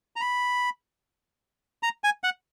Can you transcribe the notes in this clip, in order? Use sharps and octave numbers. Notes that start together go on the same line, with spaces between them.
A#5
B5
A#5
G#5
F#5